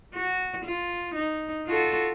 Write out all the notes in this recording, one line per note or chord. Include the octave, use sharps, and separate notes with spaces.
F#4
F4
D#4
F4 F#4 A4